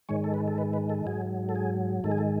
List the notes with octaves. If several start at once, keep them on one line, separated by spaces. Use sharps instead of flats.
G#2 D#3 G#3 C#5
A4
B4
A4
B4
B4
A4
G#2 F#3 G#4
A4
G#4
G#2 D#3 G#3 A4
G#4
A4